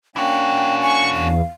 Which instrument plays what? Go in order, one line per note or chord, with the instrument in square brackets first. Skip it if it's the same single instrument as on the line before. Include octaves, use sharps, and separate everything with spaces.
[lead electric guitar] E3 F#4 [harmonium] A#3 C#4 D4 [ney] G5
[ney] G#5 [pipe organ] C#6
[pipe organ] E2 [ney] F5